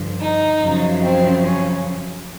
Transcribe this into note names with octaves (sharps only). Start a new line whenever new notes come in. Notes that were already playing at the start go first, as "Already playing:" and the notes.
Already playing: G2 D3 F3
D#4
F#2 C#3 F3
C4
C#4